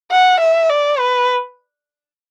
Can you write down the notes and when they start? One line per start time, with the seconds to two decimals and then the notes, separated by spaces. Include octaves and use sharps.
0.11 F#5
0.40 E5
0.69 D5
0.99 B4